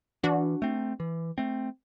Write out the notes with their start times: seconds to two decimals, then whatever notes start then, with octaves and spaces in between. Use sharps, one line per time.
0.23 E3 D4 F#4
0.62 A3 C4
1.00 E3
1.38 A3 C4